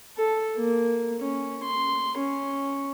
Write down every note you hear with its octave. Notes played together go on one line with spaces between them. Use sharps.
A4
A#3
C#4
C6
C#4